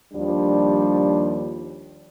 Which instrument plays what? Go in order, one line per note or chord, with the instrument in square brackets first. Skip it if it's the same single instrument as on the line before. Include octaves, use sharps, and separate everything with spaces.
[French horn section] D#2 F3 G3 D4